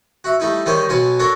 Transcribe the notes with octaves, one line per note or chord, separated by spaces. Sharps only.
F#4 E5
G3 A3 D#4 E4
D#3 G3 G#3 D#4 C5 C#5
B1 B2 F#3 F4 G#5 B5
D4 F#4 A4 A#4 C#5